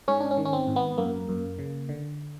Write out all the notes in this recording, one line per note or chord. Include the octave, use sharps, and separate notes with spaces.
G#2 C#4
D4
C#4
D#3
C#4
C4
G#2
B3
F#2 A#3
F#2
C#3
D3